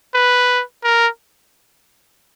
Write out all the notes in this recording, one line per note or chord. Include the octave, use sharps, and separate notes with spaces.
B4
A#4